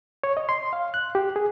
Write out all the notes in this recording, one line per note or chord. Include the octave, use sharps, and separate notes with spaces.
C#5
D#5
C6
F5
F#6
G4
G#4